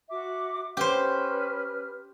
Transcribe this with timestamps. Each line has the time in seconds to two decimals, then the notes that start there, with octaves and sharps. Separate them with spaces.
0.09 F#4 E5 D6
0.77 C#4 G4 B4 C5 F6